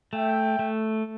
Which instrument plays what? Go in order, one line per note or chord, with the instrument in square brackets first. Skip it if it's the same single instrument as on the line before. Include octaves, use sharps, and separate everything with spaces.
[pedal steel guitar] A3 [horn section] E5 G5
[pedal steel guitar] A3